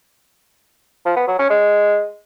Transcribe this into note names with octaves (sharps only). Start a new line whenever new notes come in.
F3
B3
F#3
C#4
G#3